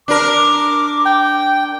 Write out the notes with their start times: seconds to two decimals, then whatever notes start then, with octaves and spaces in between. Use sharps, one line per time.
0.08 D4 A#4 D6
1.06 G5